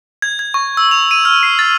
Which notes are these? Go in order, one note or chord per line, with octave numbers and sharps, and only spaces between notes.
G#6
G#6
C#6
E6
F7
D#7
F6
C7
A6